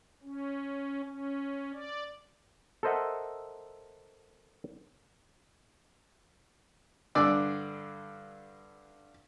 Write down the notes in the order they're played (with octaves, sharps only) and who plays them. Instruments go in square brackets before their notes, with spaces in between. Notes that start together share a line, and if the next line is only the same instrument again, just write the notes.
[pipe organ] C#4
C#4
D5
[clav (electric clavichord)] A4 A#4 C5 D#5 E5 F#5
[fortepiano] G2 D3 D4 D5 D6 E6